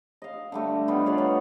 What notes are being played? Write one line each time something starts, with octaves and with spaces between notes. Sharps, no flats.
D#5 F5
D3 G3 A3
D#3 G3 B3 F4
B4 C#5 D5 F5
B3 D#4